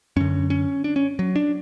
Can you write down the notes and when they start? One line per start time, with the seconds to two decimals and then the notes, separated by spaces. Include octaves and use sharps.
0.16 F#2 D3 C#4
0.50 C#4
0.84 D4
0.96 C#4
1.19 F#3
1.36 D4